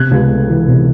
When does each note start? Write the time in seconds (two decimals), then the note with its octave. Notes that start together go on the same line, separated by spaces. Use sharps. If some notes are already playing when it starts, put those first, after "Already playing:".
Already playing: C3 F#6 G#6
0.11 C#2
0.30 A3
0.49 E3
0.68 C3